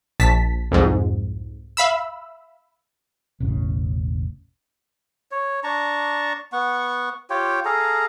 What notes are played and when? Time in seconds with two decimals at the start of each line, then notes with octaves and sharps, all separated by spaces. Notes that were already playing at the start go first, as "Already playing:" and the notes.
0.20 A#1 A5 B6
0.72 C2 F2 G#2
1.77 E5 F5 B5 E6
3.40 E1 A1 C#3
5.31 C#5
5.64 D4 A5 A#5 C#6
6.53 B3 F#5 C#6
7.30 F4 G4 C#5 G5
7.65 G#4 A4 F5 A#5